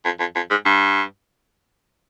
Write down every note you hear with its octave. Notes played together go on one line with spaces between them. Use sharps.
F2
F2
F2
G#2
G2